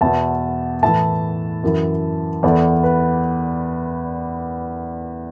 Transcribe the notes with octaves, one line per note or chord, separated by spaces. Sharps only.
E2 B2 E5 A5
A2 E3 E5 A5
F#2 E3
E2 E3 A4 D5
B4